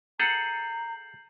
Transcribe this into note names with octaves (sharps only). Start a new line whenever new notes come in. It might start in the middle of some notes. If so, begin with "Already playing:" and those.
G#4 A4 F#5 A#5 G6 C7 F#7